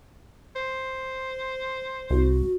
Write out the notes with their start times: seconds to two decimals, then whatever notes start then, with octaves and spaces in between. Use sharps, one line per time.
0.56 C5
2.10 C2 F#4